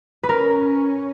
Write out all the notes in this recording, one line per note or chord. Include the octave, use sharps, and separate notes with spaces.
B4
C#4 A#4